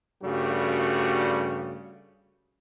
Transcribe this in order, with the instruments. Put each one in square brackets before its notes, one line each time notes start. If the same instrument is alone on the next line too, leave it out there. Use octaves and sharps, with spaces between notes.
[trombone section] G2 C#3 G3 A3 F#4